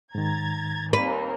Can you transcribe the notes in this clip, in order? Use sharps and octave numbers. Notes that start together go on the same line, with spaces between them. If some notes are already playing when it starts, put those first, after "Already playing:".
G#2 D#3 A#5 G#6 A6
D#2 A#3 C4 B4